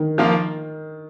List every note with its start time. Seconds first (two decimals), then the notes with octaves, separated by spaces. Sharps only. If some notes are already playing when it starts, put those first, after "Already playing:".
Already playing: D#3
0.18 F3 A#3 F4